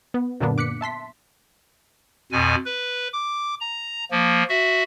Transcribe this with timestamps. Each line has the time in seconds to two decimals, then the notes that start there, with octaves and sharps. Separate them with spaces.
0.14 B3
0.40 F#2 A#2 D3 A#3 B3 D4
0.58 D6 F#6 B6 C#7
0.81 E5 A5 C6 B6
2.32 F2 B2 G#5
2.66 B4
3.13 D6
3.61 A#5
4.11 F3 A#3
4.49 F#4 E5